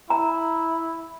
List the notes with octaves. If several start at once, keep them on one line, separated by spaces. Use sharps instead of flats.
E4 A#5